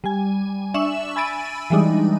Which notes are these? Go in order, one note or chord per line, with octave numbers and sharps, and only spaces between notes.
G3 G#5
D4 E5 C#6 E6 E7 F#7
G#5 B5 E6 A6 D7 D#7
E3 G3 G#3 D4 D#4